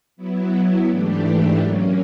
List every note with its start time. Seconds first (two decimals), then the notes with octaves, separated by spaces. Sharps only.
0.17 F#3 B3 E4
0.88 G#2 E3 A3 D4 G4
1.58 F#3 A#3 C#4